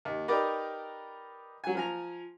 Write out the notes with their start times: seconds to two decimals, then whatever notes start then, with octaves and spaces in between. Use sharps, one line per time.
0.05 D#2
0.28 D#4 G4 A#4 B4 D5
1.64 F#3 G#5
1.75 F3 G#5 A#5